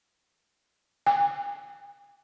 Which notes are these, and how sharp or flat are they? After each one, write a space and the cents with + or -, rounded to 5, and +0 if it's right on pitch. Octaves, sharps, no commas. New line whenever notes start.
G#5 -35